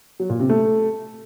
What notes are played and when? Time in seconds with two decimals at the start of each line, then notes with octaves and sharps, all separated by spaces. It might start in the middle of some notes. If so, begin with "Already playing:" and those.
0.20 F#3
0.30 A#2
0.39 C3
0.49 A3